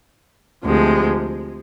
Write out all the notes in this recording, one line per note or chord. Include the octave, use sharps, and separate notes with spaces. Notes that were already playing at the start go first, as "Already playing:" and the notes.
D2 C3 F3 G#3